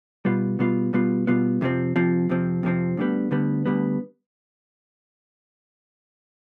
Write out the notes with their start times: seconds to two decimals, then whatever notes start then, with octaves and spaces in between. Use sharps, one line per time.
0.25 B2 G3 B3 F4
0.59 B2 G3 B3 F4
0.93 B2 G3 B3 F4
1.27 B2 G3 B3 F4
1.61 F2 C3 F3 C4
1.96 F2 C3 F3 C4
2.29 F2 C3 F3 C4
2.63 F2 C3 F3 C4
2.97 D2 D3 G3 B3
3.31 D2 D3 G3 B3
3.66 D2 D3 G3 B3